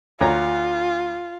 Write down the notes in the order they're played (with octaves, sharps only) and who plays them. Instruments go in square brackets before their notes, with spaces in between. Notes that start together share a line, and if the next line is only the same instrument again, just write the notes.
[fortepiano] D2 C#5 A#5 [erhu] F4